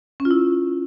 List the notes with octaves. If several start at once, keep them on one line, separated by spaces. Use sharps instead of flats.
C#4
F4
E4